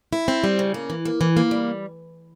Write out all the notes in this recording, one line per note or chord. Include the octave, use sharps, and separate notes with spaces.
E4
C4
G3
C#3
A#3
E3
A#3
E3
A#3
G3